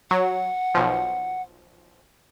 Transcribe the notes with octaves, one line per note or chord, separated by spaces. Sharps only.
F#3 F#5
B1 F3